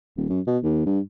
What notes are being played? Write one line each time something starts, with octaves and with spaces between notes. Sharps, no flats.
D#1
F#2
B2
D#2
G2